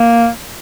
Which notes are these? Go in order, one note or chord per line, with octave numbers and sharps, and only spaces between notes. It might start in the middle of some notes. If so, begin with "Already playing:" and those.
Already playing: A#3